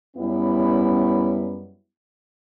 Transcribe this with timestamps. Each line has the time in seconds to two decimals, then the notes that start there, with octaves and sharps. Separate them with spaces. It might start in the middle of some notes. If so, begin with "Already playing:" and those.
0.16 F#2 G3 B3 C#4 E4